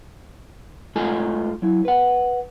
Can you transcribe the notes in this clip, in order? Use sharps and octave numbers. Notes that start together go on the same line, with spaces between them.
G#2 A3 F4 A4 D#5 G#5
F#3 E4
B4 F#5